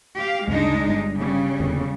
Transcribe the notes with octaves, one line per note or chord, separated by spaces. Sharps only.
G4 F5
D2 G2 C#3 G#3 D4 D#4
G1 G2
C#3 G3
D#1 E2 D3